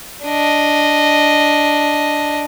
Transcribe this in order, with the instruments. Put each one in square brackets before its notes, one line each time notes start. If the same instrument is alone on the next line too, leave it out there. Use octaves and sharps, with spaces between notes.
[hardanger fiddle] D4 D#5